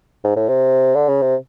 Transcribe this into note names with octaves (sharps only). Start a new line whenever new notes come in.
G#2
A2
C3
D3
C#3
C3